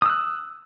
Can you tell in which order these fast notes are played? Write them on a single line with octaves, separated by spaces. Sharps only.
D#6 E6 F#6